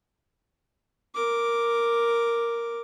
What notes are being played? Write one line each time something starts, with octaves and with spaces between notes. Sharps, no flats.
A#4 D6